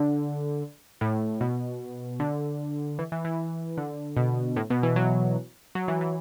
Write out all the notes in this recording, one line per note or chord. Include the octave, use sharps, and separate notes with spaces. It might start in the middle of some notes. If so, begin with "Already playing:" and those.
Already playing: D3
A2
B2
D3
E3
E3
E3
D3
B2
A2
B2
E3
F#3
F#3
E3
E3